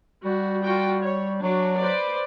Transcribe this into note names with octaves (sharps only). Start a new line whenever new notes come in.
G3 F#4
F4 F#4 G5
C#5
F#3 D4 F#4
B4 C5 D5